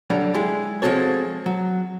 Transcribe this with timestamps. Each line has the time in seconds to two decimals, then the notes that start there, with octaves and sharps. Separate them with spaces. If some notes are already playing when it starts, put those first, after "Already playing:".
0.10 D3 F#3 G3
0.34 G#3 E4 G4 G#4
0.82 F3 G#3 C4 F#4 A4 C#5
1.46 F#3